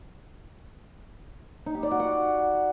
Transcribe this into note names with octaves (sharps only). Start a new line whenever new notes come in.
D#4
G4
D5
F#4
F#5